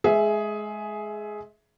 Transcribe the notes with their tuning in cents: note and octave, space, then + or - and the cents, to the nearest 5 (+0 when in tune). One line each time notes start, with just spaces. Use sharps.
G#3 +25 G#4 +10 E5 +0